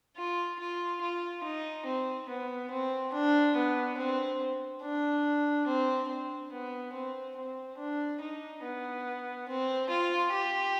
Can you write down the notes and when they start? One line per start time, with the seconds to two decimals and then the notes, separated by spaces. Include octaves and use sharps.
0.17 F4
0.59 F4
1.02 F4
1.43 D#4
1.86 C4
2.29 B3
2.71 C4
3.13 D4
3.56 B3
3.97 C4
4.82 D4
5.67 C4
6.09 C4
6.52 B3
6.93 C4
7.37 C4
7.78 D4
8.21 D#4
8.63 B3
9.48 C4
9.90 F4
10.32 G4